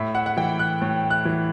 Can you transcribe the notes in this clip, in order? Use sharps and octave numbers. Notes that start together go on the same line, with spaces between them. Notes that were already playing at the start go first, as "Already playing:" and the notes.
Already playing: A2 E5
F#5
F#5
E3 G5
F#6
A2
F#6
E3